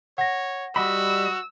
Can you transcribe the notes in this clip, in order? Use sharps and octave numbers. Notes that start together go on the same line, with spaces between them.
C#5 F#5 A#6
G3 F#4 D#5 B5 E6